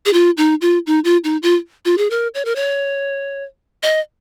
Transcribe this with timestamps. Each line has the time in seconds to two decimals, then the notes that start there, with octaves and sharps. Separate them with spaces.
0.06 G#4
0.13 F4
0.37 D#4
0.61 F4
0.87 D#4
1.04 F4
1.24 D#4
1.43 F4
1.85 F4
1.98 G#4
2.10 A#4
2.34 C#5
2.45 A#4
2.56 C#5
3.83 D#5